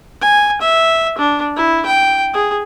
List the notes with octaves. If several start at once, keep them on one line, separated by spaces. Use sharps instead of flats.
G#5
E5
D4
E4
G5
G#4